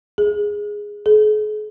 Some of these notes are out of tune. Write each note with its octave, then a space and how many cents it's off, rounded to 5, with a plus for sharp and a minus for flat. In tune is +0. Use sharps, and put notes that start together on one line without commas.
G#4 -5
G#4 +40